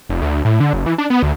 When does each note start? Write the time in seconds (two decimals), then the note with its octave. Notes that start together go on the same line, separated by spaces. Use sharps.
0.09 F1
0.22 D2
0.45 A2
0.60 D3
0.73 F#1
0.86 E3
0.98 D4
1.10 B3
1.23 D2